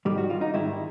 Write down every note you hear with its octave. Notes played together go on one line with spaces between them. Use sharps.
G#2 D#3 G3 G4
F#4
F4
D#4
G#2 D#3 G3 E4